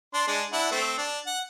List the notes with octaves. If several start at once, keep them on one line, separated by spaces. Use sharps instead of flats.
D4 C6
G#3 D4
D4 E4 F#5
A3 C4
D4
F#5